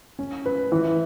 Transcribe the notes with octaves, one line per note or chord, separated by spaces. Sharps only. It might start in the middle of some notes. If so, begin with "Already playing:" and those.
C#4
B4
E3